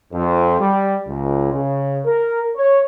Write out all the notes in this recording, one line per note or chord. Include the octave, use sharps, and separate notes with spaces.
F2
G3
C#2
C#3
A#4
C#5